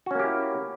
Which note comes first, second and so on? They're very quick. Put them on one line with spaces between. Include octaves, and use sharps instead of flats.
F#4 C#4 A#3 G4 E4